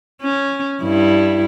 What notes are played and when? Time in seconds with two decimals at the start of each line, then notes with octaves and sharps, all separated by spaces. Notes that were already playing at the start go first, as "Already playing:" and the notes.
0.22 C#4
0.83 G2 E4